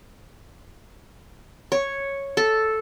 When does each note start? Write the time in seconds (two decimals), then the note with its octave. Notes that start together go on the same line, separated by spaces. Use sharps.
1.72 C#5
2.37 A4